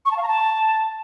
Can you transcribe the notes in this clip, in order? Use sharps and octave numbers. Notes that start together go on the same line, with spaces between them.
C#6
A5
F5
A#5
A5